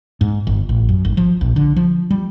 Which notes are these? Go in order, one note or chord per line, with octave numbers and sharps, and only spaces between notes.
G#2
G1
A1
F#2
G#1
F3
A#1
D3
F3
G3